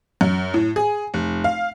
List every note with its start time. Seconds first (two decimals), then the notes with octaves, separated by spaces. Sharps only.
0.21 F#2
0.54 A2
0.76 G#4
1.14 F1
1.44 F5